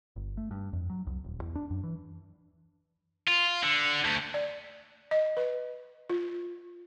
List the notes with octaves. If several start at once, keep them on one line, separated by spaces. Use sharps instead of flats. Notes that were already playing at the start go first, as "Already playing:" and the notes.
G1
A3
G2
F2
F#3
C2
D#1
E2
D4
F#2
E3
F4
D3
D2
D5
D#5
B4
F4